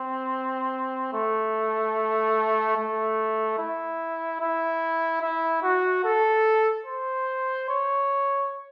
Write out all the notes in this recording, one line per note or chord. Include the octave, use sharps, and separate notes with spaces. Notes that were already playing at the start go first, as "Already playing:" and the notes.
Already playing: C4
A3
A3
E4
E4
E4
F#4
A4
C5
C#5